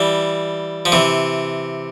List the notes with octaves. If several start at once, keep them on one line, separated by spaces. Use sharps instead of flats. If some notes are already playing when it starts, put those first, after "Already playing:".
Already playing: E3 G3
F3
C3 E3